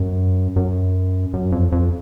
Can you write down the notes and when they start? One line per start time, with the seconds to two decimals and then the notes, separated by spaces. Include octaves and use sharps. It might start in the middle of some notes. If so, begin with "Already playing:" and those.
Already playing: F#2
0.56 F#2
1.34 F#2
1.52 F2
1.72 F2